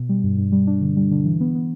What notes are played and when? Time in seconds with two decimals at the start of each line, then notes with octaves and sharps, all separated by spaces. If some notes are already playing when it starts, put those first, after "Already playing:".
Already playing: B2
0.09 G3
0.24 G2
0.38 G2
0.52 G3
0.67 D4
0.82 D3
0.97 G3
1.11 D3
1.25 E3
1.41 B3
1.55 B3